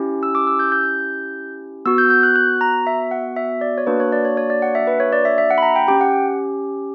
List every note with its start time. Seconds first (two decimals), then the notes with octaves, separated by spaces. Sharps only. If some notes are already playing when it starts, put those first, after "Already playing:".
Already playing: C#4 E4 G4
0.23 E6
0.35 D6
0.47 E6
0.59 G6
0.72 G6
1.86 B3 F#4 E6
1.98 G6
2.10 G6
2.23 F#6
2.36 F#6
2.61 A#5
2.87 E5
3.11 F#5
3.36 E5
3.61 D5
3.78 C#5
3.87 A#3 D4 F#4 B4
4.00 C#5
4.12 D5
4.25 C#5
4.37 C#5
4.50 D5
4.62 F#5
4.75 E5
4.87 B4
5.00 C#5
5.13 D5
5.25 E5
5.38 E5
5.51 F#5
5.58 B5
5.62 A#5
5.76 G5
5.88 C#4 G4 G5
6.01 F#5